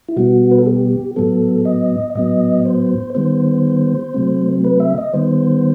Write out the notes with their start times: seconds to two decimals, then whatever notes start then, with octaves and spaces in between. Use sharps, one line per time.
0.08 E4
0.17 B2 G3 B3 F#4
0.51 B4
0.59 A4
0.66 G4
1.16 A2 F#3 B3 A4
1.65 D#5
2.15 A2 F#3 B3 D#5
2.65 C5
3.15 D#3 G3 B3 C5
4.14 C3 F#3 A3 C4
4.64 B4
4.80 E5
4.98 D#5
5.13 D#3 G3 B3 C5